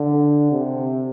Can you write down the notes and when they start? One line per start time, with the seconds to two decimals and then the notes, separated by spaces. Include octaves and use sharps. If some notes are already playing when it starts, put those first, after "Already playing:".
Already playing: D3
0.52 C3